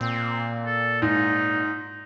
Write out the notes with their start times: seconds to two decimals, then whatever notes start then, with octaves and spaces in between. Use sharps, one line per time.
0.01 A#2 C4
0.66 A4
1.02 G#2 D#4